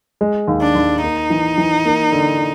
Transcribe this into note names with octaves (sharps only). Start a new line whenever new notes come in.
G#3
D#2
D4
D#2
A#3 D#4
E3
E3
A#3
D3